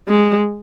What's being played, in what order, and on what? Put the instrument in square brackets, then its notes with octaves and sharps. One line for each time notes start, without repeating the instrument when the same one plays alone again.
[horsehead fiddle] G#3